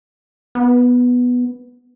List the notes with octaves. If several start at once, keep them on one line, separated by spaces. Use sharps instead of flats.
B3